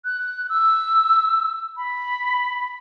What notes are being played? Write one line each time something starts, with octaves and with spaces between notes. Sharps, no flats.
F#6
E6
B5